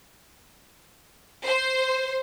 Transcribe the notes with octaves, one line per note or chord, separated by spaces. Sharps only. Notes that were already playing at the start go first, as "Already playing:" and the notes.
C5